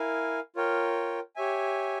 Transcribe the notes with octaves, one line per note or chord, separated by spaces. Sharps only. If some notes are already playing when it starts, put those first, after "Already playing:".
Already playing: E4 A#4 F5 G#5
F4 A#4 C#5 G5
G4 C#5 E5 G#5